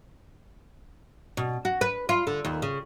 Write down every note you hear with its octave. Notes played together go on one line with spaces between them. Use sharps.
B2
F#4
B4
F4
D3
D#2
C#3